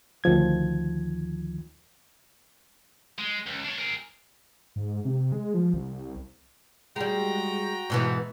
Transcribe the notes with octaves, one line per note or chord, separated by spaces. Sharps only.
D2 D#3 F3 G#6
G#3
C#2
D4 C#5
G#4 A#4
G#2
C3
G#3
F3
C2
G3 G#3 F#4 G5 A#5
G#2 B2 E3